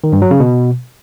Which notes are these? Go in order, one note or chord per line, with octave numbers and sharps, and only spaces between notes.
D#3
G2
F#3
C#3
B2